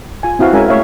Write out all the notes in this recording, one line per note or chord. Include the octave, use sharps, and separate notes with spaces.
F4 G#5
C4 E4 F#4 F5
G#3 C#4 A#4 E5 G#5
A3 C#5 E5 F5